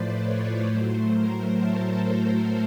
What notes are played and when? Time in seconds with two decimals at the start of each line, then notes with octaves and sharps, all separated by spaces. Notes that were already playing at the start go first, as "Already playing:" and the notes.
Already playing: A2 F3 A3 B4 C5 D5
0.20 C#5
0.66 A2 F#3 A3 C5
1.12 A#4
1.58 A4
2.04 A#4